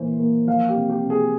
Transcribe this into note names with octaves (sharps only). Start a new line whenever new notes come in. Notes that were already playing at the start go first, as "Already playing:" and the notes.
Already playing: A#2 E3 A#3 C5
A#3
F3 F5
G4
C3
G4
C3
G#4